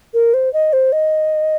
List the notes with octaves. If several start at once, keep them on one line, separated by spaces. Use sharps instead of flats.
A#4
C5
D#5
C5
D#5